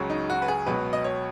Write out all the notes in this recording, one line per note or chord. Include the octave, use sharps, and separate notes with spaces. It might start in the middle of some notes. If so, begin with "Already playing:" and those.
Already playing: C#2 C#3 F#3
D#4
F#4
B4
G#4
C#2 B2 F#3 B4
D#5
C#5